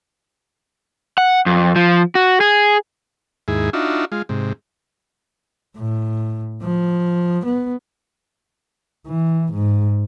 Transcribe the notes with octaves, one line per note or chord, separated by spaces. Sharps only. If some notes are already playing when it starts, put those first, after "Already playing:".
F#5
F2
F3
F#4
G#4
D#2 G#2 E4 G#4
D4 D#4 F4 F#4 E5
G#3 F4
G#2 C3
A2
F3
B3
E3
G#2